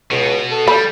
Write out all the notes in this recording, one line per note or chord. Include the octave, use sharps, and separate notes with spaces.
C#2 B2
A4
G3 B5